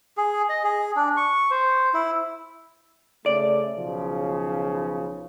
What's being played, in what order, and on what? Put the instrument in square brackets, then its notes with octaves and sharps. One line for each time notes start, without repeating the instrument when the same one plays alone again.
[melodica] G#4
D#5
G#4
D4
C#6
C5
E4
[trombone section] C#3 A3 [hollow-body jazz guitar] D5
[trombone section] B1 C#3 F3